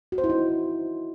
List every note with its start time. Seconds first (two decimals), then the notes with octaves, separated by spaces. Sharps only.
0.12 F#4
0.18 C5
0.24 E4
0.29 D#4